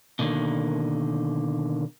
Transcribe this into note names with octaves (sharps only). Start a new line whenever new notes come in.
B2 D3 D#3 A#3